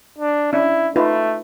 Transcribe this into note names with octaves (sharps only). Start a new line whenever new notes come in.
D4
C#4 D4 E4
A3 D#4 F4 B4